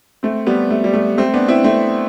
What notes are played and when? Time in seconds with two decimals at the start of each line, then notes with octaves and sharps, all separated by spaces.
0.23 A3 C4
0.46 G3 B3
0.70 A3
0.84 G3
0.94 A3
1.18 A3 C4
1.34 B3 D4
1.48 C4 E4
1.64 A3 C4